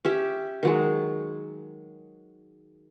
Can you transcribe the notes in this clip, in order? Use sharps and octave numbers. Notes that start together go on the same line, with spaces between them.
C#4 G4 E5
D#3 F#3 G#3